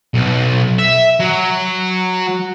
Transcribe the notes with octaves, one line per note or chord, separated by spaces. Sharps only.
B1
E5
F#3